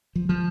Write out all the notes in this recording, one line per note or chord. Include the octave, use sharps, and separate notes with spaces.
F3
F3